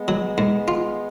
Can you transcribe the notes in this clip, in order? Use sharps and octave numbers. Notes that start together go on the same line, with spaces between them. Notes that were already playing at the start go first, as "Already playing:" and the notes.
Already playing: G#3 B3
F#3
G#2
F4